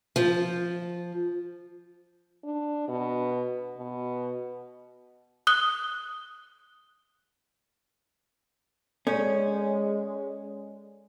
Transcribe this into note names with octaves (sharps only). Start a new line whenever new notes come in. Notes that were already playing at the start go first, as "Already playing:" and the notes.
F3
D4
B2
B2
D#6 F#6 G7
G#3 C#4 A4 C#5 D5